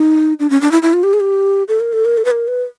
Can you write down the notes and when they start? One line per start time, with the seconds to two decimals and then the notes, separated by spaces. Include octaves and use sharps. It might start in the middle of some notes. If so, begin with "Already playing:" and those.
Already playing: D#4
0.40 D4
0.50 C#4
0.61 D4
0.71 E4
0.82 E4
0.93 F4
1.03 G4
1.13 G#4
1.20 G4
1.68 A4
1.80 A#4
1.93 A4
2.05 A#4
2.17 A4
2.25 B4
2.31 A#4
2.48 B4